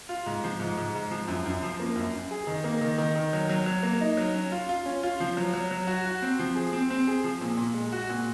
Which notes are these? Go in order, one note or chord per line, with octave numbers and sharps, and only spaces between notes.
F4
G#2
F3
G#2
G#2
G#2
F3
F#2
F#2
F3
A#3
F#2
F#2
G#4
D#3
A#3
D#3
D#3
D#3
F#3
F#3
F#3
A#3
D#4
F#3
C#4
F4
F4
C#4
F4
F3
F#3
F#3
F#3
F#4
F#4
C4
F3
G#4
C4
C4
G#4
F3
A#2
A#2
G#3
F#4
A#2